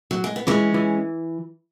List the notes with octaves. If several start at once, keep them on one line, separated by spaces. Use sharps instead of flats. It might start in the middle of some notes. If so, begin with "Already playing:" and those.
F#3
G#3
B3
E3 G#3 C#4
E3